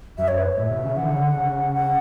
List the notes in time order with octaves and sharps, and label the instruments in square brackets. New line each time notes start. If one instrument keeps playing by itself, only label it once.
[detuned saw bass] F#2 [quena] E5
[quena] C#5
B4
C#5
[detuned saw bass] A2 [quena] E5
[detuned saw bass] B2
C#3
[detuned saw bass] E3 [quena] F#5
[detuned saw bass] D3
C#3
D3
C#3
[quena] F#5